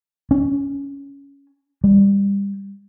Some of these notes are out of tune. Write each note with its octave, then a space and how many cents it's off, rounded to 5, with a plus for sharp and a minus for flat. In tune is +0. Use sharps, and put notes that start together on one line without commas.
C#4 +10
G3 +25